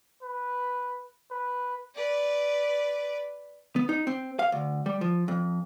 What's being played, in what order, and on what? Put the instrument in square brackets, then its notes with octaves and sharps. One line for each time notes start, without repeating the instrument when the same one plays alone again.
[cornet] B4
B4
[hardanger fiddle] B4 D5
[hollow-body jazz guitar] B3
D#4
C4
F5
D2
G3
F3
F2